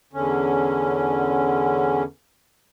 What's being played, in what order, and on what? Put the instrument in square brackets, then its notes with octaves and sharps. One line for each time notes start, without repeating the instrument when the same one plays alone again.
[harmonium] E2 D3 C#4